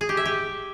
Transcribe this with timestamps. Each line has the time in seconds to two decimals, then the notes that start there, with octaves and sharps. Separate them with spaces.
0.01 G#4
0.09 G4
0.17 E5
0.26 G4